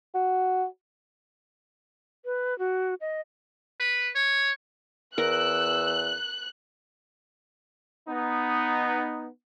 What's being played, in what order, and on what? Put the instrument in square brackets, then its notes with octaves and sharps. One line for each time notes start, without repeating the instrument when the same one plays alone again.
[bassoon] F#4
[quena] B4
F#4
D#5
[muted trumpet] B4
C#5
[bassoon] E2 [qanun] A#4 [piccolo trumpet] E6 [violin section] F#6
[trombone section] B3 D#4